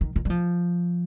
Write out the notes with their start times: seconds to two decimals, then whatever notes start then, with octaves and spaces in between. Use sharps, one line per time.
0.01 D#3
0.16 D#3
0.25 G3
0.30 F3